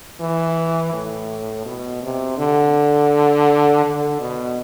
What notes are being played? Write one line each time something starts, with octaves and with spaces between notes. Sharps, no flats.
E3
A2
B2
C3
D3
D3
B2